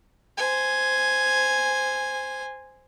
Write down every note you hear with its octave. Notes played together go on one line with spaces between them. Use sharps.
C5 G#5